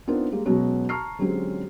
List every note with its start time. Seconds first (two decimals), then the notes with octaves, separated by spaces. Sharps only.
0.07 B3 C4 D4 D#4 F4 A#4
0.32 G3 G#3 A#3
0.46 B2 F#3 G#3 B3 C#4 F#4
0.89 A5 A#5 C#6 F6 C7
1.19 D3 F#3 G#3 C4 C#4 G4